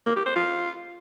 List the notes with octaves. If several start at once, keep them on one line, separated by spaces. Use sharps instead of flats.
A#3
G4
C5
F4